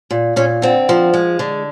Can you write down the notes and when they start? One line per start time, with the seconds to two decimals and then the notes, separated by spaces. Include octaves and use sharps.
0.11 A#2
0.36 A#2 C#4
0.62 D3 C4
0.89 F3
1.14 G#3
1.39 D3